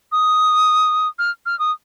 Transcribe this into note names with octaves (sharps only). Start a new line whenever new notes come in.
D#6
F6
F6
D#6